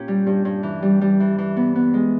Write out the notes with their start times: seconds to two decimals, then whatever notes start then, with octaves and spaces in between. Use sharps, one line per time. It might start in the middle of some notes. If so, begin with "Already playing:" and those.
Already playing: A#2 C#4 G4
0.08 G3
0.27 G2
0.45 G2
0.63 E3
0.82 G3
1.01 G3
1.20 E3
1.38 E3
1.57 B3
1.75 B3
1.94 G#3